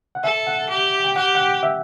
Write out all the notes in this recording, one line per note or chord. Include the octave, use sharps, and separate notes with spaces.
F#5
A4 E5
F#5
G4
G5
G4 F#5
F#5
G5
E5